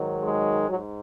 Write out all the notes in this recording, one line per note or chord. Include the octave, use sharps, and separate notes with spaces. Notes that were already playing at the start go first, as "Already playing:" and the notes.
Already playing: G#2 D#3 F#3
G#3
G#2 F#3